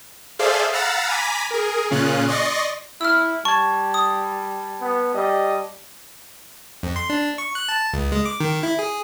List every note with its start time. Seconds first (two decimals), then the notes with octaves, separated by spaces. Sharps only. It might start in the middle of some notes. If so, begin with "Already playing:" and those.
0.39 G#4 A4 C5 D5 E5 F5
0.73 F5 F#5 A#5 B5 E6 A6
1.08 G#5 A#5 B5 D6 B6
1.51 G#4 A#4
1.91 A#2 C#3 C#4 F4 F#6
2.28 D5 D#5 C6 C#6 A#6
3.01 E4 E6 F6
3.45 G3 A5 C#6 G#6
3.94 D#6
4.81 B3
5.14 G3 D#5
6.83 F2
6.96 C6
7.10 D4
7.38 C#6
7.55 F#6
7.69 A5
7.94 C#2
8.12 G#3
8.26 D6
8.40 D#3
8.63 E4
8.79 G#4